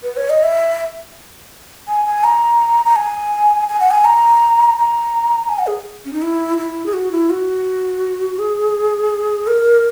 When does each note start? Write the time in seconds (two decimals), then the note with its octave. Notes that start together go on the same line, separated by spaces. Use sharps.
0.03 B4
0.17 C#5
0.30 D#5
0.43 E5
1.88 G#5
2.06 G#5
2.24 A#5
2.85 A#5
2.96 G#5
3.68 G#5
3.80 F#5
3.91 G#5
4.05 A#5
4.77 A#5
5.49 G#5
5.59 F#5
5.67 G#4
6.05 C#4
6.13 D#4
6.22 E4
6.58 E4
6.86 G#4
6.93 F#4
7.12 E4
7.30 F#4
8.39 G#4
9.47 A#4